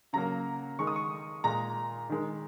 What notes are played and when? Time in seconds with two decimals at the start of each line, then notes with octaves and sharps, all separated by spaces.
0.13 C#3 F#3 A#3 A#5
0.79 D#3 G#3 C#6
0.87 D#6
0.96 C#6
1.44 A#2 G#3 A#5
2.10 D#3 G#3